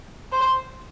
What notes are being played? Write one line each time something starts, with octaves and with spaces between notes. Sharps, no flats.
C5